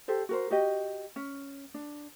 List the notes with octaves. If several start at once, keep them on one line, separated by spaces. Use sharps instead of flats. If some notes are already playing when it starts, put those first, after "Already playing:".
G4 A4 C5
F#4 A#4 C5
F#4 G4 D#5
C#4
D4